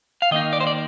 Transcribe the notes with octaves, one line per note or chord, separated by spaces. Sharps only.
F5
D#3 A#3 D#4 D#5
D5
C5
D5